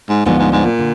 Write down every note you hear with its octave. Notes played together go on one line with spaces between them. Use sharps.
G#2
D2 G#2 D3 F3 B3
G#2
G#2
A#2
D3